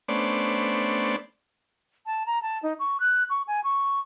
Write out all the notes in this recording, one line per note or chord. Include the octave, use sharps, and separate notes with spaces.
A3 B3 C#4 D4 C5 D5
A5
A#5
A5
D#4
C#6
F#6
C#6
G#5
C#6